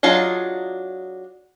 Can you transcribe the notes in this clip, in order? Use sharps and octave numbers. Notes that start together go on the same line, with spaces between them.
F#3 D4 F4 G#4 D#5